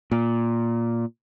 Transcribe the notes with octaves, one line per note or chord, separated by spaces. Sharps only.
A#2